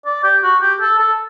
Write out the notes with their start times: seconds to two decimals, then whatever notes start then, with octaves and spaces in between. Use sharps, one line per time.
0.06 D5
0.23 G4
0.43 F#4
0.61 G4
0.81 A4
0.99 A4